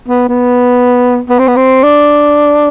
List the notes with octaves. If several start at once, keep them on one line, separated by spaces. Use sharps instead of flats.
B3
B3
B3
C4
B3
C4
D4